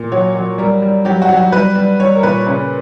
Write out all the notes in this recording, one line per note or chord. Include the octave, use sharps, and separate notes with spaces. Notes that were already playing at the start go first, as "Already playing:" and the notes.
Already playing: A#2
F#3 C#5
F#3
G3 A#4
G3
F#3 G4
F#4
F#3
F#4
G3 B4
G3
G3 C#5
A#4
A#2 B4
C#3 B4